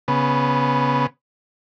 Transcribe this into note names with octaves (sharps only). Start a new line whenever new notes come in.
C#3 B3